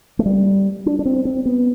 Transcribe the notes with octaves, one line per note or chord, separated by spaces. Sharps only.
A3
G3
D4
D4
C4
C4
B3